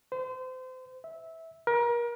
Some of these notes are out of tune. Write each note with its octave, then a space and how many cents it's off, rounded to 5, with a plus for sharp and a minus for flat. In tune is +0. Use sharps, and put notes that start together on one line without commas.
C5 -30
E5 -15
A#4 +35